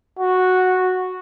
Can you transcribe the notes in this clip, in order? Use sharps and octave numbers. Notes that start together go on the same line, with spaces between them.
F#4